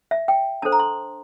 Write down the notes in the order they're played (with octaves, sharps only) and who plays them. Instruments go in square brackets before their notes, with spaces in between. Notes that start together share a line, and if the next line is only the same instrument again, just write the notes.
[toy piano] E5
G5
D4 A4 C5 A5
A#5
C6